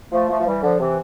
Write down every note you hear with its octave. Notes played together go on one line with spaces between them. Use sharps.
F3 A3
F3 A3
F3
E3 G3
D3 F3
C3 E3